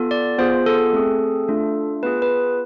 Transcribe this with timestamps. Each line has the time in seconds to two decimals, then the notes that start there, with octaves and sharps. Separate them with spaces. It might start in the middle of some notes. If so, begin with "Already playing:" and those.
Already playing: B3 F4 A4
0.11 D5
0.38 B3 F4 G#4 C5
0.66 A4
0.93 A3 C4 G#4
1.48 A3 D4 F4
2.03 B3 F4 G#4 B4
2.22 B4